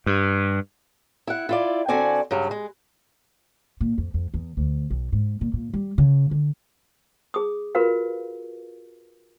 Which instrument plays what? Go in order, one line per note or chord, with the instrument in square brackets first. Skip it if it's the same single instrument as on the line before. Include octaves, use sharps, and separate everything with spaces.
[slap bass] G2
[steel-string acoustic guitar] E4 F#5
E4 F4 D5
D3 C4 F#4 D5 G#5
G2 C#3 F#3
G#3
[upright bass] A#2
F2
F2
E2
D2
B1
G#2
A#2
A#2
G3
C#3
D3
[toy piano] G#4 D#6
F4 F#4 A#4 B4 F5